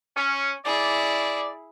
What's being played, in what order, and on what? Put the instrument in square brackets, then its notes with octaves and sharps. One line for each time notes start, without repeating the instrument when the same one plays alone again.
[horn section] C#4
[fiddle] E4 G#4 [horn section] D5